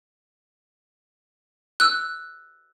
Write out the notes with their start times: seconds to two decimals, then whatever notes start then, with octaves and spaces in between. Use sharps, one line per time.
1.80 E6 F#6